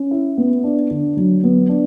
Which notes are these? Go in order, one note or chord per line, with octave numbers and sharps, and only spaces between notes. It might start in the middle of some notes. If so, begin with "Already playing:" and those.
Already playing: C#4
E4
B3
D4
D3
F#3
B3
D4